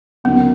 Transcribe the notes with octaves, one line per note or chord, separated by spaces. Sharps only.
D2 C#3 F#3 A#3 B3 D#4